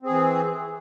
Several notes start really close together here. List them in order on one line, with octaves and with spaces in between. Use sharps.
C4 G#4 E3